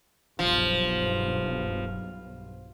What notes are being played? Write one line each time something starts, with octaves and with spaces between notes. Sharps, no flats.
D#1 B1 G2 F3